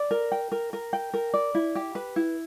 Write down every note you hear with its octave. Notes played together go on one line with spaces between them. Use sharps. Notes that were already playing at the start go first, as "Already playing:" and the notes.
Already playing: D5
A#4
G5
A#4
A#4
G5
A#4
D5
E4
G4
B4
E4